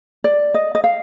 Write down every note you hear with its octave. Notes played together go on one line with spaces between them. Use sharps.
D5
D#5
D#5
F5